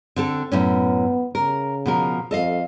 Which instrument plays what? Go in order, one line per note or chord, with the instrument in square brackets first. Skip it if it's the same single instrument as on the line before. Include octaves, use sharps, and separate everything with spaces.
[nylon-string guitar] D3 C4 A4
[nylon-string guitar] F#2 A2 C#4 [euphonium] B3
[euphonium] C#3 [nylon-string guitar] A#4
[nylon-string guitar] B2 F3 A#4
[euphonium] F2 [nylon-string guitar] A4 D#5 F5